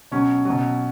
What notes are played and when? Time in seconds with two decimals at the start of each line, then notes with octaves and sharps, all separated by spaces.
0.11 B2 F#3 C#4
0.45 B2 F#3